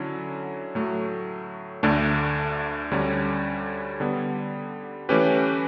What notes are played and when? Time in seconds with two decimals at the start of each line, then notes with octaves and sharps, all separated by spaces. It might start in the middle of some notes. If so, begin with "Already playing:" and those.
Already playing: D3 F#3 C#4 E4
0.75 A2 F#3 A3
1.83 D2 D3 A3 D4
2.91 D2 D3 G3 C#4
4.00 D3 G3 B3
5.09 E3 A3 C#4 G4 B4